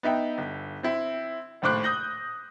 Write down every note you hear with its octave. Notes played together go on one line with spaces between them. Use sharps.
B3 D#4 E5 G5
G1
C4 E4
A#1 D#2 A2 C5 D6 F#6
D#6 G6 A#6 F#7